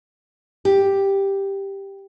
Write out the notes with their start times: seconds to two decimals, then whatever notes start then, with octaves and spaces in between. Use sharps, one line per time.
0.65 G4